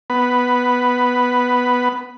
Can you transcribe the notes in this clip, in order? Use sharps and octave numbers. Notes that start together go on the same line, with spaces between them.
B3 B5